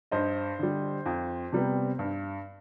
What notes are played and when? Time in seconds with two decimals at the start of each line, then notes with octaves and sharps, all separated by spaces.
0.11 G2 C5 D#5
0.59 D3 G3
1.06 F2
1.52 C3 G3 B3
1.99 G2